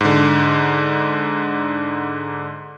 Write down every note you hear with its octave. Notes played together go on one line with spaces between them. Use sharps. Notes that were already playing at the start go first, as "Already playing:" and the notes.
G#2 D3